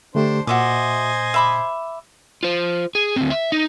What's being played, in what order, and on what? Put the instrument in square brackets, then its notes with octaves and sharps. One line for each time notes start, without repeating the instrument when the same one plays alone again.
[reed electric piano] D3 A3 G4 [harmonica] D4 C5
[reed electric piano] A#2 [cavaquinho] F#4 E5 D6 [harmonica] C5 D#5 G#5
[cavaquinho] E5 B5 D6
[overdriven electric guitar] F4 C5
G#4
D2 C4
E5
D#4